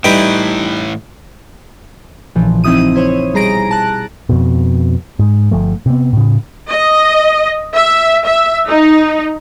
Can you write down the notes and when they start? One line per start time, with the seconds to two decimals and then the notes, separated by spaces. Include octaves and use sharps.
0.04 A2 E3 G3 D#4 E4 B4 G5
2.35 A#1 A#2 C#3 E3 F3
2.64 C4 D#4 E4 D#6 D#7
2.96 E4 C5 C#5
3.34 B2 G3 G#4 A#5 A#6 D7
3.71 A5 F#6
4.29 F2 B2
5.19 G#2
5.51 G1 F3 A3
5.86 C3 B3
6.13 A2 C#3
6.71 D#5
7.75 E5
8.26 E5
8.68 D#4